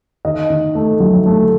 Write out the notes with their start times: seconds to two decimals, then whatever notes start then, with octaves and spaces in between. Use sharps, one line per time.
0.25 D#3 D#5
0.50 D#3
0.75 A3
1.00 F#3
1.26 A3